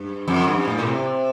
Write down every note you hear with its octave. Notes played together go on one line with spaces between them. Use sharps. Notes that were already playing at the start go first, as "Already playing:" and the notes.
Already playing: G2
F2
G2
A2
A#2
C3